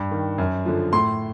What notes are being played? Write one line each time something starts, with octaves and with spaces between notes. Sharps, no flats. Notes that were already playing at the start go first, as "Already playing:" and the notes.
Already playing: G2
D#3
F#2
D3 F3
A2 C6